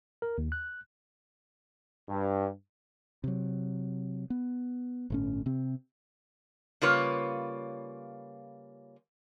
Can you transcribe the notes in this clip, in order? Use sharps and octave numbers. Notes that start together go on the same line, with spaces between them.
A#4
D#2
F#6
G2
C3 F#3
B3
G1 A2 C#4
C3 C4
C#3 G3 A#3 F4 B4 C#5